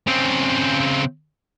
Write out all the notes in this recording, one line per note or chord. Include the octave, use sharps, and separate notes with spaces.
C#3 C4